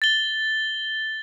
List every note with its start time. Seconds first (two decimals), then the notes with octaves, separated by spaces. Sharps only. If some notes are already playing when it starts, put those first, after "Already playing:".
0.02 A6 G7